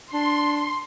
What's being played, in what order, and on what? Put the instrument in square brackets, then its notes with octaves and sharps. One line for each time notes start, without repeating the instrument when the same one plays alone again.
[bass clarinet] D4 [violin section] C6